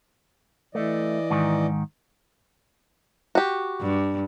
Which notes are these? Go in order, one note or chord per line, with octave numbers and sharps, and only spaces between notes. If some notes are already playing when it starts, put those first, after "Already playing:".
E3 A3 D5 D#5
G#2 D#3
F#4 G4
G2